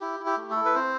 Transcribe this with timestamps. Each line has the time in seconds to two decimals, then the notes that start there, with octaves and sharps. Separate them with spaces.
0.01 E4 G4
0.20 E4
0.26 G4
0.37 A3
0.51 A4
0.56 E4
0.66 B4
0.75 C4 C5